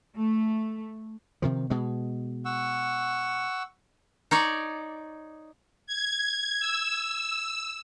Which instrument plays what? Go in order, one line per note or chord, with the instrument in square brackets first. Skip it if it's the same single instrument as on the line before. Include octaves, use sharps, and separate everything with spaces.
[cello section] A3
[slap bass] C3 D#3 F3
B2 G#3
[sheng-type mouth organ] F#5 C#6 E6
[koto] D#4 C#5 D5
[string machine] G#6
E6